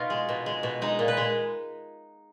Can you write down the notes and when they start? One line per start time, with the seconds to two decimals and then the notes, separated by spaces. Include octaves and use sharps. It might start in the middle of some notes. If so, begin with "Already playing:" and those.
Already playing: B2 D#4 F4
0.10 G#3
0.29 B2
0.46 G#3
0.63 B2
0.82 G#3 D#4
0.99 A#2
1.08 B4
1.17 G#3